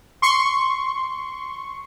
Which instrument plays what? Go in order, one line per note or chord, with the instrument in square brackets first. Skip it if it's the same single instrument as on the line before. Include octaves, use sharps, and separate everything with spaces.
[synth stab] C6 C#6